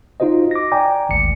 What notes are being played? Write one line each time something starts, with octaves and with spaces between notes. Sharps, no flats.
D#4 F4 F#4 C5 D#5
D6 A#6
D5 G5 G#5 A#5 D6
G#1 D2 C#7